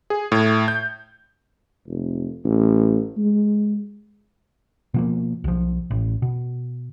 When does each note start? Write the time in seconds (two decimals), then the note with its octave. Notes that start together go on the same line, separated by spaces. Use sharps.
0.10 G#4
0.32 A2
0.68 G6
1.88 F1
2.44 A1
3.18 G#3
4.94 B2 F3 A#3
5.44 B1 F3
5.91 A1
6.22 B2